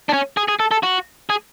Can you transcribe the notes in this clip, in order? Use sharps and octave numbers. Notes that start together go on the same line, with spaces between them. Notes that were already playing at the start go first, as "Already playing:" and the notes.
D4
C#4
G#4
G#4
A4
A4
F#4
G#4